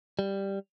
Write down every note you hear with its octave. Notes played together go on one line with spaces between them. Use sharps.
G3